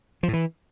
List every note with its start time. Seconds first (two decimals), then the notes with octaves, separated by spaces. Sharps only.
0.23 F3
0.28 A2
0.33 E3